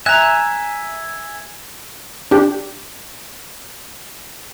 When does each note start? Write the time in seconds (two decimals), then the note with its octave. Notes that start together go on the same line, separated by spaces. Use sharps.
0.06 E5 G#5 A#5 F#6
2.31 D4 G4